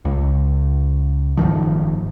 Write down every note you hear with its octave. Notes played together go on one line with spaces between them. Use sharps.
C#2
F#1 G#2 D#3 F3